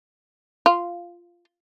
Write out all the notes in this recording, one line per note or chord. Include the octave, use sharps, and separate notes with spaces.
F4